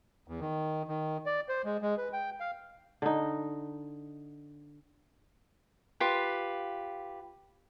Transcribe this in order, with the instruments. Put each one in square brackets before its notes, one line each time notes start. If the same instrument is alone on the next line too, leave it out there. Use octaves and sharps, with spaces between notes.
[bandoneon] E2
D#3
D#3
D5
C5
G#3
G#3
B4
G5
F5
[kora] D3 D#4
[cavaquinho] F4 G4 B4